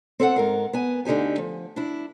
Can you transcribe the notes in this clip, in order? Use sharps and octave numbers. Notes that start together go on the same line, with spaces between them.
C4 A4 F5 F#5
G#2 A#4 F5
B3 G#5
D2 D3 D#4 G4 G#5
F3
D4 E4